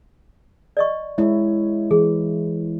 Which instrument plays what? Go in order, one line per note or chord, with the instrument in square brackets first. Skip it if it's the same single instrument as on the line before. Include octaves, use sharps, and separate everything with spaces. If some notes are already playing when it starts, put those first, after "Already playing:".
[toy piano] D5 D#5 C#6
[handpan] G#3 E4 C#5 [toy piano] E5
[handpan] E3 [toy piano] G#4